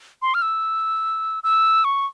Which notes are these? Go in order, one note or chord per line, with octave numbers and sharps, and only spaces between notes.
C6
F6
E6
E6
C#6